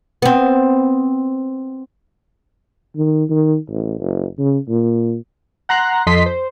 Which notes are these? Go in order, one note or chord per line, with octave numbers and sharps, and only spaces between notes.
B3 C4
D#3
D#3
A1
F#1
C#3
A#2
F#5 A#5 C6 F#6 A#6
F2 A4 D#5 C6 B6
C5